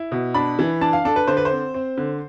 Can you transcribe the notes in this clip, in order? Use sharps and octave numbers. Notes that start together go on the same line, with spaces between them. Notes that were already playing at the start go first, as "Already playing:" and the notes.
Already playing: E4
B2
D4 B5
E3
D4 A5
F5
D4 A4
B4
D3 C5
B4
C5
C4
C4
D3